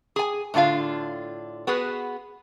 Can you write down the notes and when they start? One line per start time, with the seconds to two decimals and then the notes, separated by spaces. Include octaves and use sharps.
0.16 G#4 G#5
0.54 A2 D3 D4 F4 F5
1.67 B3 F#4 G#4 B4